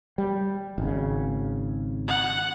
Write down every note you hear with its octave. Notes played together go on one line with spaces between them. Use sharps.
G3
G#1 C#3
F#5